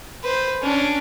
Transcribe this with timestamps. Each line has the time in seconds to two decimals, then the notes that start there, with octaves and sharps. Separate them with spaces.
0.24 B4 C5
0.62 C#4 D4